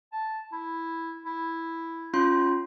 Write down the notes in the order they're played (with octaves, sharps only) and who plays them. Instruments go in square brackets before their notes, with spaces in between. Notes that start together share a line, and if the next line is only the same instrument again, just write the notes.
[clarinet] A5
E4
E4
[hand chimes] C#4 F4 C6